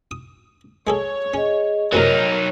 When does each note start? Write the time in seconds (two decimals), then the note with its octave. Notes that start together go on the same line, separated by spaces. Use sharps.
0.11 D#6
0.87 G#3 G#4 A4 C#5
1.34 C#4 G#4 D#5
1.93 F#2 A2 C3 F#3 D#4 A#4 C#5